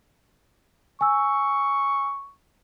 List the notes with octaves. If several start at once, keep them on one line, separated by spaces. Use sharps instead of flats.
G#5 C#6 E6